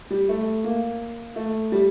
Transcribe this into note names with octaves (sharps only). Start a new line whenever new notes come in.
G3
A3
A#3
A3
G3